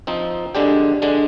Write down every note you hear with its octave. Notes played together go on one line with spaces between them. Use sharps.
F3 C4 D#4
D3 G#3 D4 G4
D3 G#3 D4